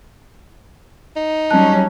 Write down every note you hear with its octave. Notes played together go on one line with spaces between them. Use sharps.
D#4
F#3 G3 C#4 A5 F#6